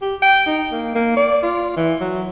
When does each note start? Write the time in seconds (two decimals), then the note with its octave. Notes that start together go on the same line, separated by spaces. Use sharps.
0.01 G4
0.22 G5
0.46 D#4
0.71 A#3
0.95 A#3
1.17 D5
1.42 F4
1.76 E3
2.00 F#3